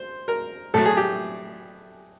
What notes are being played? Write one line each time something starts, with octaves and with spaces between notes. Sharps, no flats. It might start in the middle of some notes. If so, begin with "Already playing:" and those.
Already playing: C5
A#4
A2 F#3 A3 A4
G#4
G4